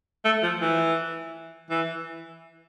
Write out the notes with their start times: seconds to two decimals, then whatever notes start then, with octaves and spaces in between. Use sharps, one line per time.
0.25 A3
0.43 F3
0.61 E3
1.70 E3